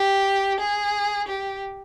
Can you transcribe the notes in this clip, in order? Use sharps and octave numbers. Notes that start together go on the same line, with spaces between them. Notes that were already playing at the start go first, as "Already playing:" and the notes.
Already playing: G4
G#4
G4